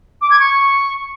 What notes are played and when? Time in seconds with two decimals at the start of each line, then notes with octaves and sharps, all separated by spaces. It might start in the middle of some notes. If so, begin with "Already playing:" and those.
0.21 D6
0.30 G#6
0.39 C#6